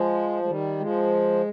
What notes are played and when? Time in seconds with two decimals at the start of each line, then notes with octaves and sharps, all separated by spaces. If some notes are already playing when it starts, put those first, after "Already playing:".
Already playing: F3 G#3
0.43 G#3
0.48 D#3 G3
0.80 F3 G#3